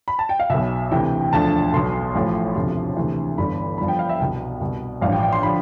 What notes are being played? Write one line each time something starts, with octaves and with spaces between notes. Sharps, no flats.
B5
A5
G5
F5
B1 B2 E5
D2 C3 E3 G5
E1 D2 D3 F3 A5
B1 B2 C6
A1 A2 F3
E1 D2 C3 F3
D2 C3 E3
G1 G2 E3 B5
G1 G2 F3 B5
G5
F5
E5
C2 B2
C2 B2
A1 G2 F3 F5
G5
G5
C6
D3 F3 B5